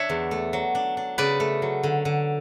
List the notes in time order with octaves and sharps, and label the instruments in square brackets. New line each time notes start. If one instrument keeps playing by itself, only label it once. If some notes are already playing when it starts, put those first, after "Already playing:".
Already playing: [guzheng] D4 C#5 E5
E2
A3
F#3
D4
D4
C#3 B4 D5
A3
F#3
D3
D3